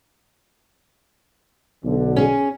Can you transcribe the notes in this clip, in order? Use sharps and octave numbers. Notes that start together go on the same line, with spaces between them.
B1 D3
C#4 G#4